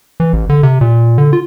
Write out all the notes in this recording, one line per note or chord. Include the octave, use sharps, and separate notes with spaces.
E3
A1
D3
C3
A#2
D3
F4